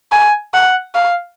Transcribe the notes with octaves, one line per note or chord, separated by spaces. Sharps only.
G#5
F#5
F5